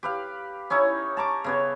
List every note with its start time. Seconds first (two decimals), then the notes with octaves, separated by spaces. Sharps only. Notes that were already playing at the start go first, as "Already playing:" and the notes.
0.03 G4 B4 F5
0.70 C#4 D#4 E4 C#5
1.17 A5 A#5 C#6 D6
1.44 C#3 B3 C#5